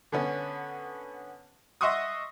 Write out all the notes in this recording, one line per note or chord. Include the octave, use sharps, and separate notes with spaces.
D3 B3 C#4
D#5 E5 F#5 C6 C#6 D#6